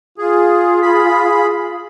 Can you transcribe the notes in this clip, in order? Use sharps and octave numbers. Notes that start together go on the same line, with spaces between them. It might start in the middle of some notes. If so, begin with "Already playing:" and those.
F4 G#4
G#4 B5